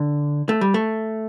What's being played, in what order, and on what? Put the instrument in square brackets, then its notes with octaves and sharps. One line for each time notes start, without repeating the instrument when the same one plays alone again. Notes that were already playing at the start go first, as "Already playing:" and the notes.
Already playing: [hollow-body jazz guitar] D3
A3
G3
A3